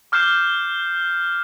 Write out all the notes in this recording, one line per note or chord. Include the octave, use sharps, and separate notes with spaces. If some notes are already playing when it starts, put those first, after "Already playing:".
D6 F6 G6 C7 E7